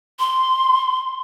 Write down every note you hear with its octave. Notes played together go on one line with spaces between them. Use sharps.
C6